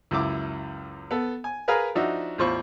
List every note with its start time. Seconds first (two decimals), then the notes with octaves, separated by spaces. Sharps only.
0.11 C#2 F#2 E4 D6
1.11 B3 A4
1.44 G#5
1.68 G#4 A#4 B4 F5 G#5 A#5
1.95 F3 D4 D#4 F#4 E5
2.38 A1 E2 F4 C5 B5 C#6